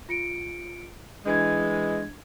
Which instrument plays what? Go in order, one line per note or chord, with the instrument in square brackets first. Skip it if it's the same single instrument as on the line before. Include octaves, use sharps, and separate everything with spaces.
[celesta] F4 C#7 D7
[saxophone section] E3 G#3 [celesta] D4 G#6